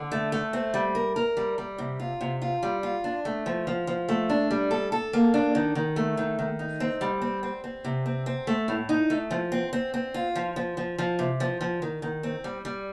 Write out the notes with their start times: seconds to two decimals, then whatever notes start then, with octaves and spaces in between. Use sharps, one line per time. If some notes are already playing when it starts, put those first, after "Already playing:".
Already playing: D3
0.12 A3
0.32 A3
0.53 C4
0.74 G3
0.95 A#4
1.16 A#4
1.37 G3
1.58 G3
1.78 C3
2.00 F4
2.21 C3
2.42 F4
2.63 G3
2.83 F4
3.04 D4
3.25 A3
3.46 F3
3.67 F3
3.87 F3
4.09 A3
4.29 D4
4.51 G3
4.71 A4
4.92 A4
5.13 A#3
5.34 D4
5.55 D#3
5.75 D#3
5.96 A3
6.17 D#3
6.39 D#3
6.59 D#4
6.80 C4
7.01 G3
7.22 C4
7.43 C4
7.64 C4
7.84 C3
8.06 C4
8.26 C4
8.47 A3
8.68 A2
8.89 D#4
9.10 A3
9.31 F3
9.52 C4
9.73 C4
9.94 C4
10.14 F4
10.35 F3
10.56 F3
10.77 F3
10.98 F3
11.19 C3
11.40 F3
11.61 F3
11.82 D#3
12.02 D#3
12.23 C4
12.44 G3
12.65 G3